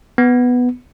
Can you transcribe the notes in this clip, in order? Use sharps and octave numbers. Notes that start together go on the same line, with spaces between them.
B3